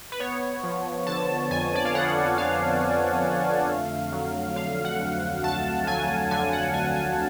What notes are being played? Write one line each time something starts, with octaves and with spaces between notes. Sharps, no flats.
B4
B3 C#5
F3
D3 A5
F2 G#5
D5
F5
B3 F#5
F3 F5
D3
F2
A3
F#3
D3 F5
F#5
D2
A3 A5
F#3 G#5
D3 G#5
F#5
D2 G#5
G#5